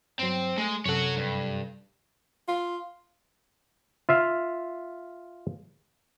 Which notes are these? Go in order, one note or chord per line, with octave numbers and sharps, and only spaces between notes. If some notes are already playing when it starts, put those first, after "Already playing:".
G2 F#3 C4
G#3 A3
F#2 C3 A4 C#5 F#5
G2
F4
F4 E5 F5